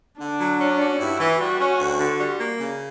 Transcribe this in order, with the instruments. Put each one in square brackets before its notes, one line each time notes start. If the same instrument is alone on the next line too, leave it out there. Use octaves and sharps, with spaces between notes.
[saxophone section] D3 [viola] D4
[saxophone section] F#3
C#4
F#4
[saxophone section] G2 [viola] E4
[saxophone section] E3
[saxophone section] G3 [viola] F#4
[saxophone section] C#4
D2
D3
G3
A#3
C#3